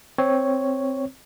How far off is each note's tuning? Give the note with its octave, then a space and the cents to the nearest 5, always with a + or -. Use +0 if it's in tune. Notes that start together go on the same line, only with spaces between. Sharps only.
C4 +0 C#5 +0